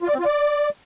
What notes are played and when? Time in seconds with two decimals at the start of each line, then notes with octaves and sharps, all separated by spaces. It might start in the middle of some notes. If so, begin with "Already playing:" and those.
0.03 F4
0.08 D5
0.14 C4
0.20 F4
0.25 D5